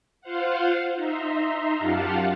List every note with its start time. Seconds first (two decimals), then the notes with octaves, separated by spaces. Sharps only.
0.21 F4 C5 F5 F#5
0.96 D#4 E5 A#5 C6
1.76 F#2 F4 G4 F5 F#5 A5